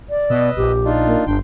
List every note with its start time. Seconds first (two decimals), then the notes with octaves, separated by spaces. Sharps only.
0.10 D5
0.30 B2 B4 D#5 E6
0.57 A#1 G4
0.85 D4 D#4 F4
1.06 A#3
1.27 G1 D4 G5 C6